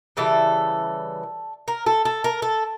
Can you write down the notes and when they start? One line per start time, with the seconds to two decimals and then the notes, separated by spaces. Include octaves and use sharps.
0.17 C#3 E3 G3 A4
1.68 A#4
1.86 A4
2.05 A4
2.24 A#4
2.42 A4